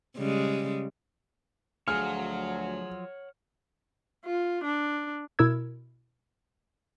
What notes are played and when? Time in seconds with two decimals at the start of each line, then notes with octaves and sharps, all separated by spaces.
0.17 C#3 G3 G#3
1.88 D2 F3 F#3 F4 G#4 C#5 F#5 F6
4.25 F4
4.64 D4
5.39 B2 E4 A#4 E6 G#6